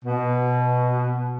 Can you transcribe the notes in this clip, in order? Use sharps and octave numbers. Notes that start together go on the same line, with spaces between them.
B2